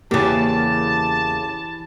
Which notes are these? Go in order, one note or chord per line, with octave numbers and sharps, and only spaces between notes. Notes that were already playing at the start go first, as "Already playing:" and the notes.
E2 C#3 E3 A#3 G4 A5